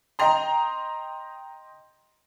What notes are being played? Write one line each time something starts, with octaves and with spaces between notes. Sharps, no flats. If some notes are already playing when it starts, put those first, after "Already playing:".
D#5 G5 A#5 C6